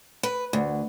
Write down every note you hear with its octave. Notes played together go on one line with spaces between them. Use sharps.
B4
D2